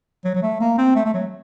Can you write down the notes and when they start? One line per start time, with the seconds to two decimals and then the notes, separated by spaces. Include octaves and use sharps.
0.24 F#3
0.35 F#3
0.43 A3
0.61 A#3
0.78 C4
0.95 A3
1.06 A3
1.14 F#3